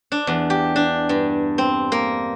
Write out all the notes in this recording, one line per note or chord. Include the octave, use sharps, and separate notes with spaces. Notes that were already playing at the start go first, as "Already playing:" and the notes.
D4
E2
G4
D4
G2
C4
A#3